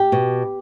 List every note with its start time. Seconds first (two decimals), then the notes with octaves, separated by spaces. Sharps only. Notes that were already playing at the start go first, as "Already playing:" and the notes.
Already playing: G4
0.12 B2